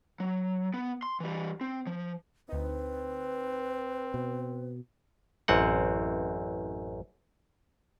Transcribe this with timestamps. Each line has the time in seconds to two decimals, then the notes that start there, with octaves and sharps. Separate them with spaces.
0.20 F#3
0.74 B3
1.03 C6
1.20 E3 G3
1.61 C4
1.87 F3
2.49 D2 C4 D#4 B4
4.14 B2
5.48 A1 F#2 C4 F#5